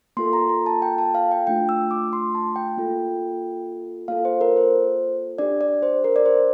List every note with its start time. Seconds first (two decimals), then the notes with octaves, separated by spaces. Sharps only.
0.17 A#3 F4 A4 C6
0.33 A#5
0.49 A#5
0.66 A5
0.82 G5
0.98 A5
1.15 F5
1.31 G5
1.47 A3 D4 F4 G5
1.69 E6
1.91 D6
2.13 C6
2.35 A5
2.56 G5
2.78 A#3 F4 A4
4.08 A#3 F4 A4 F5
4.25 C5
4.41 A#4
4.57 C5
5.38 D4 G4 D5
5.61 D5
5.82 C5
6.04 A#4
6.16 D5
6.26 C5